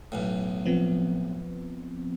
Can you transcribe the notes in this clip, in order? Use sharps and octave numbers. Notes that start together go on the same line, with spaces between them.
B1 E2 A2
F3 B3 C4